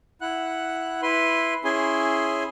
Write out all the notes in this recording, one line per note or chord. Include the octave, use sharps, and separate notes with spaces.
E4 F#5 F#6
E4 B4 C6
C#4 E4 G#4 G#5 C6